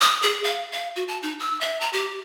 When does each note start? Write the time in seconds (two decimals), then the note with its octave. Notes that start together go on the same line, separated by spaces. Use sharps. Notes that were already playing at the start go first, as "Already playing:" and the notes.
0.01 D#6
0.23 G#4
0.44 F5
0.72 F5
0.96 F#4
1.08 A5
1.23 D#4
1.40 E6
1.61 E5
1.81 A#5
1.93 G4